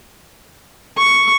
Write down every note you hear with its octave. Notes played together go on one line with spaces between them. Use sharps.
C#6